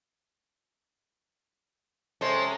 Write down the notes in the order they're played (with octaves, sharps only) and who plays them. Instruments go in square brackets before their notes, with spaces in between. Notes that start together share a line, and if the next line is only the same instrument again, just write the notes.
[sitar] C3 G#3 C#4 [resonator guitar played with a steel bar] A4 C5